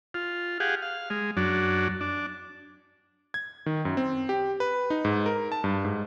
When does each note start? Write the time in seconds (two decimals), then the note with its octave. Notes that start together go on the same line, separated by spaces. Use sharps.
0.14 F4
0.60 G4 G#4 F5 F#5
0.82 F5
1.10 G#3
1.37 F#2 F#3 D4
2.01 D4
3.34 G#6
3.66 D#3
3.85 F#2
3.97 C4
4.29 G4
4.60 B4
4.90 D#4
5.05 G#2
5.26 A#4
5.52 A5
5.64 G2
5.85 G#2